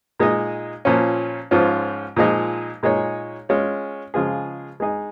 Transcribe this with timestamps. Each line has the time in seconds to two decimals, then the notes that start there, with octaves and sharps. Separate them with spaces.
0.19 A#2 G#3 D#4 G#4 D#5
0.85 A#2 F3 C#4
1.51 G#2 F3 C#4 F4
2.16 A#2 F3 G#3 D#4 G#4
2.83 A#2 G#3 D#4 G#4 C#5
3.49 G#3 C#4 F4 C#5
4.14 C#3 F3 G#3 F4 G#4
4.80 G#3 D#4 G#4 D#5